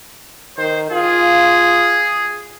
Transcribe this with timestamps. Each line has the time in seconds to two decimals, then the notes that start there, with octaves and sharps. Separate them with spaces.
0.58 D#3 C5
0.92 F4 G#4